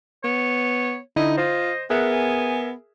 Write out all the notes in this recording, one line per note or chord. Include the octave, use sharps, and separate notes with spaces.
B3 C#5
D3 D#4 E4 D#5
F4 C5 D#5
B3 G#4 A#4 E5 F#5
G#5